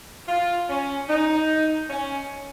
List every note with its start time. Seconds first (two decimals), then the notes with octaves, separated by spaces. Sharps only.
0.28 F4
0.69 C#4
1.09 D#4
1.90 C#4